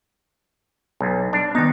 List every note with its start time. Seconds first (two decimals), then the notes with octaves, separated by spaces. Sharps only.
1.00 B1
1.33 G3 D4
1.55 D#3 G3 B3 D#4